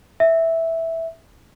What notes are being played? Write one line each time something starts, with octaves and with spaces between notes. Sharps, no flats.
E5